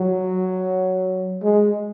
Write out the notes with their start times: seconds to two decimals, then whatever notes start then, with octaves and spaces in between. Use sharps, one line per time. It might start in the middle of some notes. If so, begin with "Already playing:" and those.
Already playing: F#3
1.43 G#3